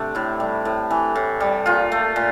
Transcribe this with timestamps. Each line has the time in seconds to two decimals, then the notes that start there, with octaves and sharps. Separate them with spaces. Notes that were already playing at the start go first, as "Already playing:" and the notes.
Already playing: C3 A3 D4
0.15 A2 E4
0.40 G3
0.65 A2
0.91 E3
1.16 A2
1.40 G3
1.66 A#2 F4
1.92 A3
2.16 A#2